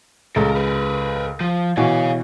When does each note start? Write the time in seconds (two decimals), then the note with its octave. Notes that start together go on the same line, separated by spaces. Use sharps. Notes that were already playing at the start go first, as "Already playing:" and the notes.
0.36 C#2 C#3 A4 A#4
0.52 A#4 B4
1.41 F3
1.77 B2 E3 F#4 C#5 F5